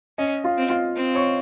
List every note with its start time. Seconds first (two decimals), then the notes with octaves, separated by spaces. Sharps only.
0.18 C#4 D#5
0.44 F4 F5
0.57 C4
0.70 F4 F5
0.96 C4
1.15 C#5 C#6